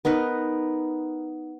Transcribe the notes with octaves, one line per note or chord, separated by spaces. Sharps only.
B3 D#4 A#4 B4